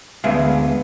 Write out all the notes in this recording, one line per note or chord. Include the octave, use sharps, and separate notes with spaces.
D2 G#3 B3 E5 F5